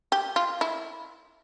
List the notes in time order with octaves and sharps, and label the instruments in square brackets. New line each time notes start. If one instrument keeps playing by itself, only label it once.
[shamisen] G4
F4
E4